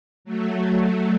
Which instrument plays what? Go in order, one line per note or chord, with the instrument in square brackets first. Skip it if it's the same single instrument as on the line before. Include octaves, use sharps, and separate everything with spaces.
[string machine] F#3 A3